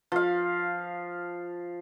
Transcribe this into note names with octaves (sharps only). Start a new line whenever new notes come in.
F3 F5